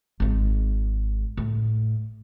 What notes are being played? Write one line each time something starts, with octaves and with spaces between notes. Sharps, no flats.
G#1 G#2
A2